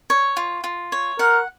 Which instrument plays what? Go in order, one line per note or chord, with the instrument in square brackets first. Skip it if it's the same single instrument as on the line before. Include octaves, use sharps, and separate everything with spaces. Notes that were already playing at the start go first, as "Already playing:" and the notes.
[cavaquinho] C#5
F4
F4
C#5
[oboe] A#4 [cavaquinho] F#5